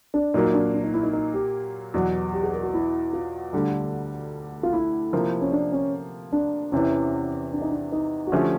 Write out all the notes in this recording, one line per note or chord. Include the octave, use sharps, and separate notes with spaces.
D4
A#2 F#3 A#3 D#4
D4
D4
D#4
E4
D#4
D#4
G4
E2 B2 F#3
G4
G#4
A#4
F#4
E4
F4
D2 D3 G3
F4
E4
C3 F3 A#3
C#4
D4
C#4
D4
E2 C3 E3 C#4
D4
D#4
D4
D#4
F#4
D3 F3 A3 C#4 G4